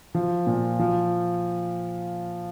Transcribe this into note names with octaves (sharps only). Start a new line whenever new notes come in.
F3
A#2
F3